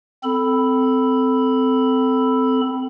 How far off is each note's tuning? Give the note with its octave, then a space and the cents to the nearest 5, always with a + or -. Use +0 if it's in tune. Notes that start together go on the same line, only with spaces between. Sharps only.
C4 -20 A4 +0 B5 +0